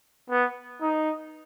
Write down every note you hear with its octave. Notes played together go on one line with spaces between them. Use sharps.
B3
D#4